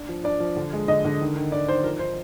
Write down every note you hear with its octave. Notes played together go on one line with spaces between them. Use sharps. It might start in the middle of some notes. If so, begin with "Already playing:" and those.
Already playing: D4
F3
D4 D5
F3
D3
G#3
D3 D#5
D3
D#3
D#3
D#3 D5
D#3 C5
F3 A#4
D#4 C5